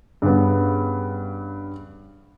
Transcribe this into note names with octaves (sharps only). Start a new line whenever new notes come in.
G2 C#3 B3